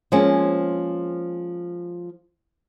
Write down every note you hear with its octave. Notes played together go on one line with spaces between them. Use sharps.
F3 G#3 A#3 C4 C#4